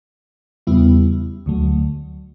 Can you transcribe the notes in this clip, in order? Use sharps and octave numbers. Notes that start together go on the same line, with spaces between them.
E2 C#3 G3 B3 E4
D2 D3 F#3 A3